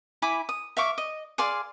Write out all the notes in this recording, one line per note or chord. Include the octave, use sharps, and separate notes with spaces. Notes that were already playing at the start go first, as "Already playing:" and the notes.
E4 G#5 B5 D6
D#6
E5 F5 C#6 D6
D#5
G#4 D5 F5 C6